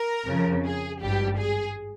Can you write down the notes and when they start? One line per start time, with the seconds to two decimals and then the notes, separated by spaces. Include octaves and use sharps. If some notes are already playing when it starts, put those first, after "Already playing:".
Already playing: A#4
0.27 F2 C#3 F3
0.65 G#4
1.01 G#1 G2 G3 G4
1.38 G#4